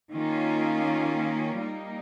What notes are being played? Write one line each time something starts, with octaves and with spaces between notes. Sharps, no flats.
D#3 A#3 C#4 F4
G3 A#3 D#4